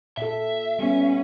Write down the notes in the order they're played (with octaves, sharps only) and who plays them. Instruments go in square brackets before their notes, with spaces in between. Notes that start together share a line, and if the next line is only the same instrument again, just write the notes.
[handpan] A#2 A4 [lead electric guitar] E5
[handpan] G3 B3 [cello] C#4